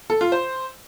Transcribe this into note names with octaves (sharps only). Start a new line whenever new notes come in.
A4
F4
C5